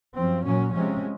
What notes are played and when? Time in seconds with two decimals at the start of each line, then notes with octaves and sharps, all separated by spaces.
0.17 F#2 F3 C4
0.45 A#2 F#3 C#4
0.74 C3 F3 G#3 C#4